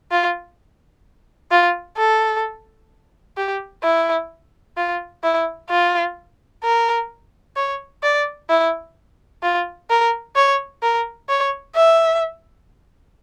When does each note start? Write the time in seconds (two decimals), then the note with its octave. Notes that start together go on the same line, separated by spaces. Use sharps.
0.11 F4
1.51 F4
1.97 A4
3.37 G4
3.84 E4
4.77 F4
5.23 E4
5.70 F4
6.64 A#4
7.56 C#5
8.03 D5
8.50 E4
9.43 F4
9.90 A#4
10.36 C#5
10.83 A#4
11.29 C#5
11.76 E5